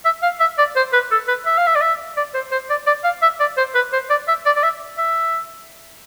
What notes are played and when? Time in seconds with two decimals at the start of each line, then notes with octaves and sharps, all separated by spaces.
0.05 E5
0.23 F5
0.40 E5
0.58 D5
0.76 C5
0.93 B4
1.11 A4
1.28 B4
1.46 E5
1.57 F5
1.67 E5
1.75 D5
1.82 E5
2.17 D5
2.34 C5
2.52 C5
2.70 D5
2.87 D5
3.04 F5
3.22 E5
3.40 D5
3.57 C5
3.75 B4
3.93 C5
4.10 D5
4.28 E5
4.46 D5
4.56 D5
4.63 E5
4.98 E5